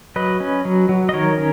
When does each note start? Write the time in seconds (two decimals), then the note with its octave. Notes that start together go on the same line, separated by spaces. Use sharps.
0.16 F#3 B4 D#5
0.40 C#4
0.65 F#3
0.89 F#3
1.09 D#5
1.14 D#3 A#4 C#5
1.38 C#4